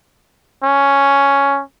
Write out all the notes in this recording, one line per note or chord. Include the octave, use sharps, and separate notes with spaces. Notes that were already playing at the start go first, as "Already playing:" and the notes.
C#4